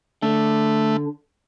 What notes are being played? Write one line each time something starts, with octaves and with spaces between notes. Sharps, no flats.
D3 A3